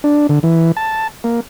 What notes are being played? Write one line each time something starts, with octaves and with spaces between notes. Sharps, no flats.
D4
D3
E3
A5
A#3